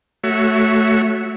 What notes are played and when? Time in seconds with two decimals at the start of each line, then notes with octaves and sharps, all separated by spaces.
0.24 A3 F#4 C#5 E5